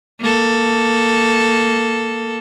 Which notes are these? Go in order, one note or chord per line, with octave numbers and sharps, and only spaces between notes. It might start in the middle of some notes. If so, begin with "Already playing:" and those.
A#3 A4